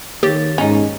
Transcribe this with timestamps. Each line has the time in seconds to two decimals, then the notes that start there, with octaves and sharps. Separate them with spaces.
0.23 D#3 A#3 G4 C#5 A6
0.58 G#2 C#4 D#4